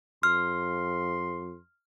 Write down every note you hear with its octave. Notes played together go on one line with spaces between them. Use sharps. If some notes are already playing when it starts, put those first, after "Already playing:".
F2 C6 F6